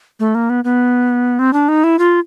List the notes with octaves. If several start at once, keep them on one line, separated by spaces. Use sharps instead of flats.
A3
A#3
B3
B3
C4
D4
D#4
E4
F4